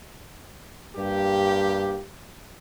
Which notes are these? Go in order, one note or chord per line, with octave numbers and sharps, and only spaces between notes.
G2 A#3 G4